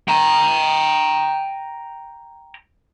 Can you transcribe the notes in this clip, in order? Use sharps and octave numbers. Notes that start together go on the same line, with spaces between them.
G5 A#5